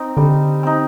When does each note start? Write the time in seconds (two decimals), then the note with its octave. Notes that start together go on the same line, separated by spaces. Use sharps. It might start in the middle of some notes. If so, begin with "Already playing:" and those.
Already playing: C4 D#4
0.17 D3 G3
0.63 C4 D#4